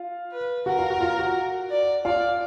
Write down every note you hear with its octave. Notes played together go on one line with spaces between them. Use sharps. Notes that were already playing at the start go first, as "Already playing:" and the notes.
Already playing: F4 F5
B4
F#4 A#4 F#5
F4 F5
F#4 F#5
F4 F5
F#4 F#5
D5
F4 D5 F5